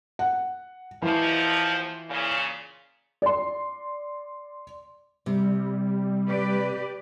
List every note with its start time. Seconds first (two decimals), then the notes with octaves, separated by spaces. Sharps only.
0.19 F#5
1.02 D#2 E3 F3
2.09 A#2 C#3
3.22 D5 C6
5.26 C3 G3
6.28 G4 B4 D5